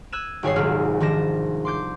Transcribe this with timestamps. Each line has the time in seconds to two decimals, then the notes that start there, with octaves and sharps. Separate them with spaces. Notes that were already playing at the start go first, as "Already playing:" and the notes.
0.12 E6 F#6 G#6 D#7 E7
0.43 G#1 G3 G#4 C#5 E6 C7
0.56 D#1 C2 F#3 G#3 E6 F6
1.00 D#3 F3 D4 A#6 E7
1.65 C6 D6 G6